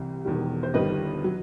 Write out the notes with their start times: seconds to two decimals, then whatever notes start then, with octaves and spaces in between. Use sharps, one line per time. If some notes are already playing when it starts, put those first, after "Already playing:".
Already playing: C2 C3 E3 G3
0.25 E1 E2 D#3 G3
0.63 C5
0.74 G1 G2 D#3 G3 B4 D#5
1.24 F#3